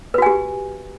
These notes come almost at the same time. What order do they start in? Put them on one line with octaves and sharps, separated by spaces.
B4 F#4 G#5 G4